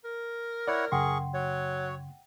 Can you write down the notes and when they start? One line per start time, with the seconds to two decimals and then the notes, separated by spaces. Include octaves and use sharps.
0.04 A#4
0.68 E4 C#5 D5 F#5
0.92 F#2 C#3 G#4 F#5 G5 C6 C#6
1.34 F#3 C#5